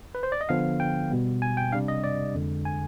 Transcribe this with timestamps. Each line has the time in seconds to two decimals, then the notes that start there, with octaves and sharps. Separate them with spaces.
0.15 B4
0.23 C5
0.32 D5
0.41 D#5
0.49 D3 F3 B3 F5
0.80 G5
1.11 B2 G3 B3
1.42 G#5
1.57 G5
1.72 C3 G3 D4 F5
1.88 D#5
2.04 D5
2.35 F2 D3 G#3
2.65 G#5